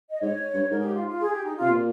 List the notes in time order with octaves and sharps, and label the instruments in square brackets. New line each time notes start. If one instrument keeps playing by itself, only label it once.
[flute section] D#5
[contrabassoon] G#2 [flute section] C#5
[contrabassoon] G2
[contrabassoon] G#2 [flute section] A#4
[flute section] G#4
G4
F4
F4
G#4
G4
D#4
[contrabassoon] C3 [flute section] F4
[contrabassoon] A#2